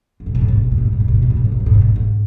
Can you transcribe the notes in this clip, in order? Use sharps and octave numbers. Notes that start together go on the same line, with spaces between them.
G#2
B2
G#2
B2
G#2
B2
G#2
B2
G#2
B2
G#2
B2
G#2
B2
G#2
B2
G#2
B2
G#2
B2
G#2
B2
G#2
B2
G#2